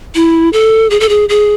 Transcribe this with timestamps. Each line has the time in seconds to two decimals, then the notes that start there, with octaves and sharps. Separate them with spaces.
0.15 E4
0.53 A4
0.90 G#4
1.00 A4
1.09 G#4
1.29 G#4